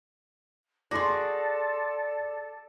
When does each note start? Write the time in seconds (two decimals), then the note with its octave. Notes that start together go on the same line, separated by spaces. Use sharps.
0.91 F#4 G#4 A4 D5 C6 A#6